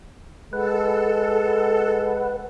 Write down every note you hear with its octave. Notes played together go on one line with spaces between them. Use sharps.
G#3 A4 B4 F#5